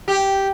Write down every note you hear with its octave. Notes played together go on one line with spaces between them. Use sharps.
G4